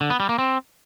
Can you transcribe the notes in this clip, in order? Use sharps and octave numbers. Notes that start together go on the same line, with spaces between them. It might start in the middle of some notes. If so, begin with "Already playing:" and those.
D3
B3
G3
A#3
C4